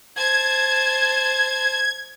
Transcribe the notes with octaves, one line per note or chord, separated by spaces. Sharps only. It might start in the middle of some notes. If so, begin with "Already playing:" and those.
C5 A5 G#6